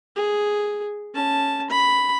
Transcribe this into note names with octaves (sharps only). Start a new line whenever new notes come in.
G#4
C#4 A5
B5